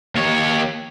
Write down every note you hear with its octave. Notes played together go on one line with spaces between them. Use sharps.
D#2 C#5